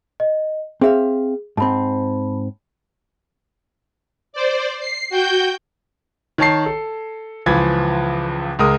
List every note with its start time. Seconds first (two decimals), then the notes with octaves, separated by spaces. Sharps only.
0.20 D#5
0.81 C4 G#4 E5 F5
1.57 G#2 C4 A5 B5
4.33 C5 D5
4.80 C7
5.10 F#4 G5 G6
6.38 D#3 C#5 A5 C7
6.66 A4
7.46 C#2 E3 F3 B5 G#6
8.59 C#2 G#3 A#4 D#6